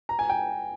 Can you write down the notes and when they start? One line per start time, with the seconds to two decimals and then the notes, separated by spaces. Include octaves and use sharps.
0.09 A#5
0.19 G#5
0.29 G5